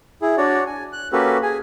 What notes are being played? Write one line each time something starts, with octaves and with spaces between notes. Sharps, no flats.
E4 G#4
D4 F#4 C#5 D5
G#5
F#6
A#3 C#4 F#4 G4 A4 B4
G#4 G#5